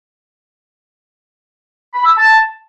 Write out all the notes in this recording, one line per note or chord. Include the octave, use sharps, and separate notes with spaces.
B5
E6
A5